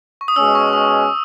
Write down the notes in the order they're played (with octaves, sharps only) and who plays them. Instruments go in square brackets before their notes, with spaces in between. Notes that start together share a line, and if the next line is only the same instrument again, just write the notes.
[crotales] C#6
D#6
[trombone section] B2 G#3 C#4 [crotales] E6
[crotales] C#6
D#6